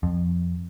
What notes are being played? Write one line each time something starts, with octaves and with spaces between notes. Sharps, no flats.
F2